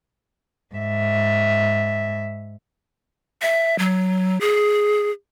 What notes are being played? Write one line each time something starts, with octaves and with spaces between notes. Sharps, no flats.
G#2 E5
E5
F#3
G#4